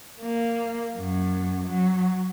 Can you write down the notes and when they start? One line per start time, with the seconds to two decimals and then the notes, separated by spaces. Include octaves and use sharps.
0.20 A#3
0.97 F#2
1.66 F#3